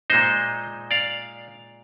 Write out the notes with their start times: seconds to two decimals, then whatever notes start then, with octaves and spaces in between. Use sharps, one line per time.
0.10 A#2 G#3 D#4 C5 D#5
0.91 D5 F5